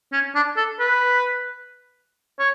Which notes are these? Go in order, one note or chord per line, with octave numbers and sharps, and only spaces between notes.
C#4
D4
A4
B4
C#5